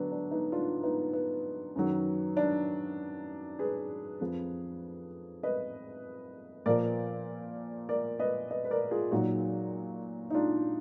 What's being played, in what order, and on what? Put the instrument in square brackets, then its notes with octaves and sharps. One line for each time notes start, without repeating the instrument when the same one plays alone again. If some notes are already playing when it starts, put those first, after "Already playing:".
Already playing: [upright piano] D3 F#3 B3 D4
D4
B3 D#4
D4 F4
B3 D#4
B3
F#2 D#3 F#3
D4
G#4 B4
F2 F3
B4 D#5
A#2 F3 A#4 D5
A#4 D5
B4 D#5
B4 D#5
B4
A#4 D5
F4 G#4
A#2 F#3 D#4 F#4
D#4
D4 F4